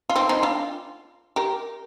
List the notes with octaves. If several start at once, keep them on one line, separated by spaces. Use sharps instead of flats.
F4
C4 D#4
C4 D#4
D4 F4
G4 A#4